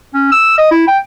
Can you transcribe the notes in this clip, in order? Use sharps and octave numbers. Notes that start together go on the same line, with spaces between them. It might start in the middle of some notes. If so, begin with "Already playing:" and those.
C#4
E6
D#5
E4
G5